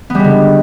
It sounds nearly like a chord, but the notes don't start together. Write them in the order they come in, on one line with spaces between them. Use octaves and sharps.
B3 G3 G#3 D3